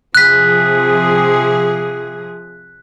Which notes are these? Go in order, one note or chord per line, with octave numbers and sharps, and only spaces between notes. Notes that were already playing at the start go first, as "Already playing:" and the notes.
C3 F3 G#4 F#6 B6